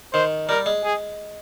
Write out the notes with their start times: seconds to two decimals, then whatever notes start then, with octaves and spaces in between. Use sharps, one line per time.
0.13 D#3 C5
0.49 G3 A#4
0.66 G#3
0.84 G#4